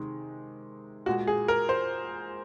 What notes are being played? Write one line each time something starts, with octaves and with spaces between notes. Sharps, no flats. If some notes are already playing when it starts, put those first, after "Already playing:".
Already playing: C3 D#3 G#3
A#2 G#3 F#4
G#4
A#4
C5